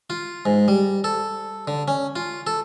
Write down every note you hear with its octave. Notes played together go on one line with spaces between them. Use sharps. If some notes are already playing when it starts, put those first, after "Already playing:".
F4
G#2
G3
A4
D3
C#4
F4
A4